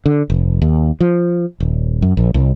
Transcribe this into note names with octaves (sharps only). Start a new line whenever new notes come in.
D3
F1
D#2
F3
D#1
F#2
A#1
C2